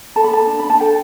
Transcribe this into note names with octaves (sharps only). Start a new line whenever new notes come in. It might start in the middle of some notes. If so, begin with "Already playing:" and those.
A4 A5
B5
A4 A5
D4
D4 B5
A5
A4 G5